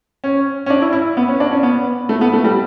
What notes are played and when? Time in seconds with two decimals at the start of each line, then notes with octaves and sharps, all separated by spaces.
0.24 C#4
0.66 C#4
0.70 D4
0.82 E4
0.93 E4
1.17 B3
1.28 C#4
1.40 D4
1.51 C#4
1.63 B3
2.09 A3
2.21 B3
2.33 A3
2.44 G3